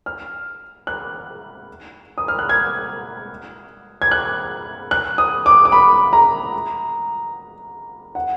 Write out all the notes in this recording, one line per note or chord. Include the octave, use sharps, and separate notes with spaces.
F6
F#6
D#6
F6
F#6
G#6
G#6
F#6
F#6
D#6
D6
D6
B5
A#5
F#5